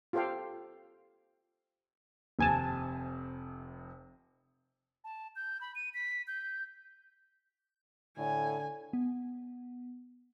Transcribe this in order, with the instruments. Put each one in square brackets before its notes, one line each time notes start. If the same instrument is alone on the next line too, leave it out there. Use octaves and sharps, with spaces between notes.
[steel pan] F4 G4 A4 C5 F5 G5
[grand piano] F1 C3 [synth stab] D#2 G#5 A5
[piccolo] A5
G6
B5
D#7
B6
G6
[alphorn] A2 [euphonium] D3 [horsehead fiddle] G#5
[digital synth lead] B3